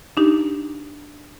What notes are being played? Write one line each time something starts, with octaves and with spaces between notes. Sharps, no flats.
D4 D#4 G4